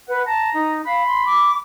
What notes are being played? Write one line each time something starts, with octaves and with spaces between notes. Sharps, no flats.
B4 F#5
A5 A#5
D#4
F5 B5
C6
D6